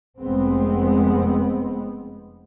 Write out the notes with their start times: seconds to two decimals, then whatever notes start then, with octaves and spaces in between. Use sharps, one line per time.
0.19 F1 G#3 B3 C4